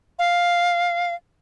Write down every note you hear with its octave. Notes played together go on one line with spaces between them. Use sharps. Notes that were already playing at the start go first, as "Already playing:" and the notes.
F5